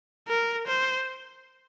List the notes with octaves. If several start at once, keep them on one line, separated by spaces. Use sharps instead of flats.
A#4
C5